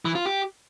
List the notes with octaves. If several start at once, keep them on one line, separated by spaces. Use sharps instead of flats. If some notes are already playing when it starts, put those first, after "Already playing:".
E3
F4
G4